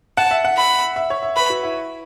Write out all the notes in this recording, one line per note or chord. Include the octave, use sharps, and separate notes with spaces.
F#5 A5
E5
F#5
B5
E5
C#5
E5
B4 B5
F#4
E4